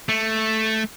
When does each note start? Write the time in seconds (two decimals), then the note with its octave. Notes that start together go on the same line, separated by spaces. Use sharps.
0.09 A3